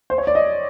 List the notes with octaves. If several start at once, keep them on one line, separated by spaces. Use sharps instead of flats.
C5
C#5
D5
D#5